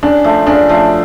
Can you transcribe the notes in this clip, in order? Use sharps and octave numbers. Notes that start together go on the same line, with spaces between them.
C#3 D4
F3 A3
C#3 D4
F3 A3